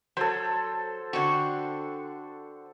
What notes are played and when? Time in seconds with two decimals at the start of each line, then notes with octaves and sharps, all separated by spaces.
0.17 F#3 A4 C5
1.13 D3 C4 F#4